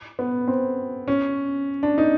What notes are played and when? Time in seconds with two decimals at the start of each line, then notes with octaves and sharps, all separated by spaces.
0.19 B3
0.48 C4
1.08 C#4
1.83 D4
1.98 D#4